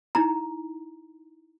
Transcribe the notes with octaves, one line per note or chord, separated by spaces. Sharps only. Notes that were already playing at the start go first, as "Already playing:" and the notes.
D#4 E4 A#5